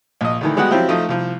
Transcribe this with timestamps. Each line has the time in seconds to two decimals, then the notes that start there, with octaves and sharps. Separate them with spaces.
0.21 A#1 D#5
0.41 D2 D#3 E3
0.56 G3 G#3 B3 F#4 G4 F#5
0.71 F3 F#3 C4 E4 F4 G4
0.89 F3 A3 D#4 D#6
1.09 C2 F3